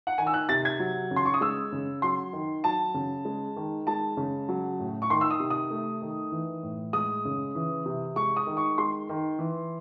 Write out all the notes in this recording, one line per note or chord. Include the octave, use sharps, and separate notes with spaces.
F#5
D#3 G#5
E6
F#6
C3 A6
G#6
F#3
C#3
C6
C#6
D#6
G#3 E6
C#3
F#3 C6
D#3
F#3 A5
C#3
G#3
D#3
G#3 A5
C#3
F#3
A2
C#6
D#3 C6
E6
D#6
C3
D#6
A3
D#3
E3
A2
G#3 D#6
C#3
E3
C3
G#3 C#6
D#6
D#3
C#6
G#3 C6
D#3
E3